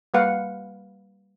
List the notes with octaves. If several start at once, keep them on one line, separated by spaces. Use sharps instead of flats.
G3 A#3 B4 F5 F#5